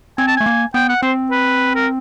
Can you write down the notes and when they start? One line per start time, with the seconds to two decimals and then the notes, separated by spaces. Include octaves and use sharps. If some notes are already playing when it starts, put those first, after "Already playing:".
0.18 C4 G#5
0.27 A5
0.37 A3 G#5
0.46 A#3
0.74 B3 G5
0.89 F#5
1.02 C4 C5
1.31 B4
1.75 A#4